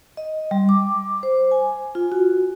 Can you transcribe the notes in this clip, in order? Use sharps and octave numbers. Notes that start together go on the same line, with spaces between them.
D#5
G3
D6
C5
G#5
F4
F#4